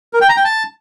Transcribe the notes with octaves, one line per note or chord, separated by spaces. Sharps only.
A#4
G5
A#5
G5
A5